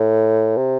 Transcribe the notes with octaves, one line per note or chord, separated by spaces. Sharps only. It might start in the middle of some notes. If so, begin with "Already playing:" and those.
Already playing: A2
C3